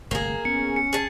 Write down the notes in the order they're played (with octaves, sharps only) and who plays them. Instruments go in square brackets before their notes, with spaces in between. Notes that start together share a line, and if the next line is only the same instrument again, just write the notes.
[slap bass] G1 C3 A3 [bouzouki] A#3 G#4
[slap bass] B3 [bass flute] C#4 [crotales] C#7
[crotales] C#7
[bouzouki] G#4 A5